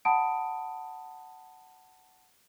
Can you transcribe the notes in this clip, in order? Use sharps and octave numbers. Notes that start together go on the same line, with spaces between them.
F#5 A5 B5 D#6 D7